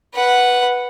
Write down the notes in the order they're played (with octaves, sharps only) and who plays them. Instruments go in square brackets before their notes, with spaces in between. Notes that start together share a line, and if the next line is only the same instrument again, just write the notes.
[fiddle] B4 F#5